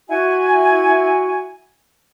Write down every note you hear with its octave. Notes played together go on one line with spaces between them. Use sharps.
E4 F#4 F#5 G#5